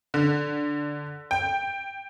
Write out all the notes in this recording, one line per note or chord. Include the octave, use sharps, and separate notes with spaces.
D3
G5